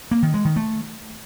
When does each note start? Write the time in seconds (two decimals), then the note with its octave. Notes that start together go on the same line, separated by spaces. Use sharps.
0.11 A#3
0.23 D#3
0.34 G#3
0.45 D#3
0.56 A3